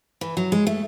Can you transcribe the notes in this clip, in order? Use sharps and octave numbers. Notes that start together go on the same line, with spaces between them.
E3
F#3
G#3
A3